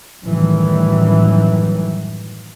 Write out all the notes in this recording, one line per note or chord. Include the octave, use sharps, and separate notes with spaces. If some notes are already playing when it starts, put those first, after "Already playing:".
F#2 A2 D#3 E3 G3